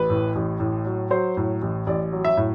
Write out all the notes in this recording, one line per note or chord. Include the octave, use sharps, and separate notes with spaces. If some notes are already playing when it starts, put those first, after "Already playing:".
Already playing: A1 B4
A2
A1
A2
F#3
F#3 C5
A2
A1
A1 D5
F#3
E5
A2